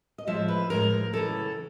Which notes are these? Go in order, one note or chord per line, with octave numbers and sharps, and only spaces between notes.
D#5
A2 F3 G#3 E5
B4
A2 F3 G#3 A#4
F#2 C#3 E3 A4